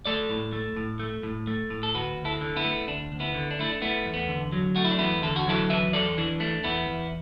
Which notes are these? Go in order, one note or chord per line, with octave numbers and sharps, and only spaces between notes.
A3 A4 D5
A2
A3
A2
A3
A2
A3
A2
A4
D2 F#4 B4
D2
E4 A4
D3
B3 E4
A3
D2 D4
D2
B3 E4
D3
D4
A3 E4
D4
A3 B3 E4
E2
B3
D3
F#3
A3 F#4
E4
D4
E2 B3 E4
D3 A4
F#4
F#3 E4 A4
E2 B4 E5
E2 A4 D5
E3 D4
A3 D4
E2 B3 E4
E2